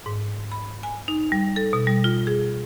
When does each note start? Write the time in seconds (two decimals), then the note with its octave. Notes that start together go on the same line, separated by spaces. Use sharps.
0.06 G#2
0.52 B5
0.83 G#5
1.08 D#4
1.32 G3
1.56 A4
1.73 B2
1.87 G3
2.04 F4
2.27 G#4